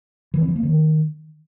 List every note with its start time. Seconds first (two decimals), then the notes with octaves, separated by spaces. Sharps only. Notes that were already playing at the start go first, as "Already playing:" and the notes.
0.34 E3
0.41 C4
0.48 F3
0.56 A#3
0.63 D#3